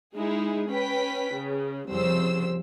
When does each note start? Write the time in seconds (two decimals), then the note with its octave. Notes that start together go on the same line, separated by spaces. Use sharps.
0.15 G#3 D#4 E4 G#4
0.68 C#4 B4 G5 B6
1.34 C#3
1.88 C2 F2 C#3 F3 C5 E6